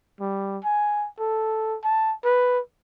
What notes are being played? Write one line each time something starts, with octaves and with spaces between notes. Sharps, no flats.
G3
G#5
A4
A5
B4